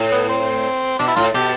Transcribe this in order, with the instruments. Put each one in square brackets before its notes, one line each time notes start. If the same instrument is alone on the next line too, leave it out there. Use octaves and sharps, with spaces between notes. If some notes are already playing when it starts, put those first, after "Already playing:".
Already playing: [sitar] A2
[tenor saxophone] B3
C4
[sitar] B2 [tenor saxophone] D4
[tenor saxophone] E4
[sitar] A2 [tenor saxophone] F4
[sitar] B2 [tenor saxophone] G4